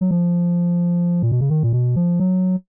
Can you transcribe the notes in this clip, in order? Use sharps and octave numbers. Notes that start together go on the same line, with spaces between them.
F#3
F3
A#2
B2
C#3
D#3
A#2
B2
F3
F#3